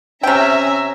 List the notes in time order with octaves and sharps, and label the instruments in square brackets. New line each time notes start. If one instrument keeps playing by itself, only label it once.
[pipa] C3 G5 [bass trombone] C#4 [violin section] E5 G#5 A#5 [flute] E6